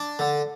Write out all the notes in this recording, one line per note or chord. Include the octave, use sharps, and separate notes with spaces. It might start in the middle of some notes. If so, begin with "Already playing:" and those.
Already playing: D4
D3